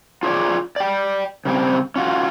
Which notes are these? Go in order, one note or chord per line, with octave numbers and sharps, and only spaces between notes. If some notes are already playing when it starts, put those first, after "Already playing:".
F4 G#4 B4 C#5 D5
D5 G5
C#3 G3 C4
C#4 F4 F#4